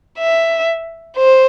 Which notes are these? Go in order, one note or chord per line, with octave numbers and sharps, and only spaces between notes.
E5
C5